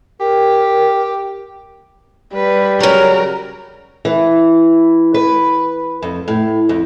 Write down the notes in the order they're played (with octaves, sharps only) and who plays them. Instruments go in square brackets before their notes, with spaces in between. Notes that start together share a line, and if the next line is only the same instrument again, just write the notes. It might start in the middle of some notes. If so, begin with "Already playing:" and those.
[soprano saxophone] G4 [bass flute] A#4
[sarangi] G3 [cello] B4
[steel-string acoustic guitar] C#3 F#3 [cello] A#4
[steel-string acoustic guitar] E3
B4
F2
A2
F2